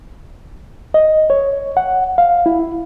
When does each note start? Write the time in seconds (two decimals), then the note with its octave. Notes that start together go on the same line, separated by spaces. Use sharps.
0.94 D#5
1.30 C#5
1.77 F#5
2.18 F5
2.46 E4